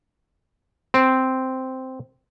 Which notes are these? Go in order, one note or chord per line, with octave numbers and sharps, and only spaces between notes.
C4